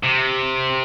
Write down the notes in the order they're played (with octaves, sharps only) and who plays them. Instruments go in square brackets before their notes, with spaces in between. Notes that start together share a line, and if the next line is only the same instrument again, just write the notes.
[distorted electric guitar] C3